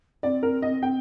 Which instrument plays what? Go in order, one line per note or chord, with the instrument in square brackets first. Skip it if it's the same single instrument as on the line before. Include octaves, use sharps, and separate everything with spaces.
[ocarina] C4 [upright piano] D5
[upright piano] A#4
D#5
G5